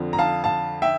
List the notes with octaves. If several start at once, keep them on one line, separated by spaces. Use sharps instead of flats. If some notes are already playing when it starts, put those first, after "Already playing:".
Already playing: F2 D3 F3
A#5
F5 A5
F5 A5
E5 G5